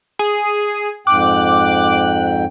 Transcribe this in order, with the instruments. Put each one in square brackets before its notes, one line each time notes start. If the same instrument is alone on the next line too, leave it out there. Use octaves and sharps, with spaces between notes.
[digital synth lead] G#4
[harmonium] F2 G#2 G5 [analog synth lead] D6 [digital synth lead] F#6